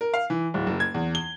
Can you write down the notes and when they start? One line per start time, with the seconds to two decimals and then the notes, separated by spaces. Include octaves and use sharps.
0.01 A#4
0.14 F5
0.30 E3
0.54 D1
0.67 F#1
0.80 G#6
0.94 E2
1.15 G7